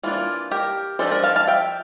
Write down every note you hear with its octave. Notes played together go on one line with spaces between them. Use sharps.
E3 A#3 D4 F4
G4 A#4
F3 A3 D4 A4 C5
A#4 D5
F5 A5
F5 A5
E5 G5